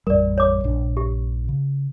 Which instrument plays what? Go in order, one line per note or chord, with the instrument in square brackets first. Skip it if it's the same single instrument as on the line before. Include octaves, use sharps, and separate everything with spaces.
[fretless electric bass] A1 F2 G3 [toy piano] A#4 D5
[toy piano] C#5 D6
[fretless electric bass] A#1 G2 D4
[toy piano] G4
[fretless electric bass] C#3